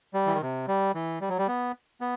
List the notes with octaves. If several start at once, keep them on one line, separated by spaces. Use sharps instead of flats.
G3
E3
D#3
C3
G3
E3
G3
F#3
G3
B3
B3